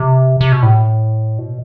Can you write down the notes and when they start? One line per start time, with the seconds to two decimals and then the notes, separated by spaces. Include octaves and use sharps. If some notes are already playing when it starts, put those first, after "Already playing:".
Already playing: C3
0.41 C3
0.52 B2
0.63 A2
1.38 B2